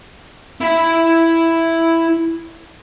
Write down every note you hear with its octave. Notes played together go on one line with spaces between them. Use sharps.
E4 B5